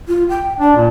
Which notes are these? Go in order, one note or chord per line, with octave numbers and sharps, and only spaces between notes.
F4
G5
D4 D5
A#2